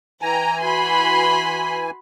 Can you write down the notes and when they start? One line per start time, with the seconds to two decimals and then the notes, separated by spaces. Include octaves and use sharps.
0.22 E3 G5 G#5 A#5
0.61 F#4 B5 C6